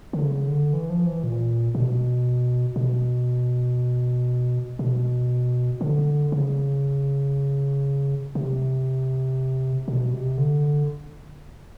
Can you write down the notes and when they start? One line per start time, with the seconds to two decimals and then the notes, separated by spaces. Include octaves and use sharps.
0.13 D3
0.23 C#3
0.48 D3
0.73 E3
0.90 F3
1.07 E3
1.24 A#2
1.75 B2
2.76 B2
4.79 B2
5.81 D3
6.32 C#3
8.35 C3
9.88 B2
10.13 C3
10.38 D3